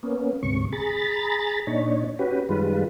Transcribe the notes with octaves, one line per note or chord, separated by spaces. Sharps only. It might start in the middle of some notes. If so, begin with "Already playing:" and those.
A#3 B3 C#4
D2 G#2 C3 C#6
G#4 A#5 B5 A6
A#2 D4 D#4 C#5
C#4 F#4 G4 B4
F#2 D#3 G3 G#3 F4 B4